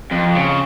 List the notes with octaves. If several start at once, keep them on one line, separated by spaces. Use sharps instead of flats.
F2
C#3